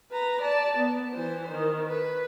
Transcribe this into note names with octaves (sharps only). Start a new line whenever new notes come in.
B4 A#5
D5 A5
B3
E3 C5
D#3
B4